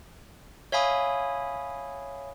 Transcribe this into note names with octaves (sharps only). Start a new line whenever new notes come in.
C#5 E5 F5 G#5 B5 D#6